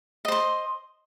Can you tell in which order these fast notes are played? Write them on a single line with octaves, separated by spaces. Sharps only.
D#5 C5 C6